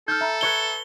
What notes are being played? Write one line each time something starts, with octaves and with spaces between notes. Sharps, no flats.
D#4 A4 F6 G6
E5 A#5 B5
B4 C#5 C#7 G7